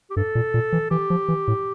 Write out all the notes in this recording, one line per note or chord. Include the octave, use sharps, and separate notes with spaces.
G4
G2 A4
A#2
A#2
E3
E3 G4
F3
E3
A2